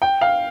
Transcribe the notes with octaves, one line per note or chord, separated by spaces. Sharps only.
G5
F5